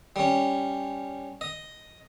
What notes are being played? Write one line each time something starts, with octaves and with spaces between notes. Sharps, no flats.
G3 C#4
D#5